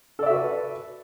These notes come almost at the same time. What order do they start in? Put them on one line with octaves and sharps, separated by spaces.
A4 D5 E5 F#4 B4